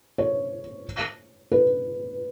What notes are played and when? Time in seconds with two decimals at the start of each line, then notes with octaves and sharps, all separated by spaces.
0.18 C#5
1.52 B4